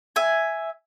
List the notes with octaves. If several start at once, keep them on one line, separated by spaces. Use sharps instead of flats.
E5 G#5